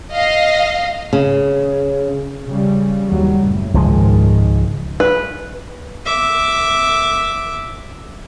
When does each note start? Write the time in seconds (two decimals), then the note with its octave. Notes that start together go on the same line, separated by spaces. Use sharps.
0.14 D#5 F5
1.13 C#3
2.45 C#3 G3
3.06 D#2 F#3 G3
3.40 F#1 A2
3.74 C#2 G#2 D#3 F3 G#3
5.00 B4
6.06 E5 D6